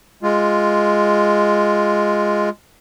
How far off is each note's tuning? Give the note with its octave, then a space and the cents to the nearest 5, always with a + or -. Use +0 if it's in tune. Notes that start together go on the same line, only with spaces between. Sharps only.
G#3 +0 F4 +0